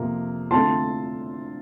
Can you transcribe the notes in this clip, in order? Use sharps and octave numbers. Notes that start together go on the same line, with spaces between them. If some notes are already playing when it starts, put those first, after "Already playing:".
Already playing: F2 C3 F3 A#3
D3 A3 C4 F4 A5 C6